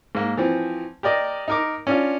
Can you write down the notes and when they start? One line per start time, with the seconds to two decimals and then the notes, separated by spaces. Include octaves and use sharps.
0.15 G#2 A#3
0.37 E3 F3 C4
1.03 G4 A#4 D5 D#5
1.48 D#4 A#4 D6
1.87 C#4 D4 F4